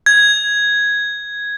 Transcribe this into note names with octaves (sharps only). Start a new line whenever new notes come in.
G#6